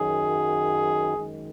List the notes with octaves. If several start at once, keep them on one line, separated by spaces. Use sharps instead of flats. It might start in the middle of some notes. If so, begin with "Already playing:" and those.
Already playing: F#2 D#3 F#3 G#4
F#2 D#3 G#3